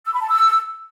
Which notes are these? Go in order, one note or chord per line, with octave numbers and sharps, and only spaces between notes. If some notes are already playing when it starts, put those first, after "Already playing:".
E6
B5
A5
E6